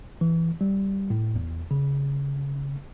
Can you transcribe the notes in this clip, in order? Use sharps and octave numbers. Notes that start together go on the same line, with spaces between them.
E3
G3
A2
E2
C#3